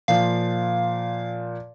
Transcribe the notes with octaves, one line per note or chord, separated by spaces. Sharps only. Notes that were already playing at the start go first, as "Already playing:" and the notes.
A#2 F3 F5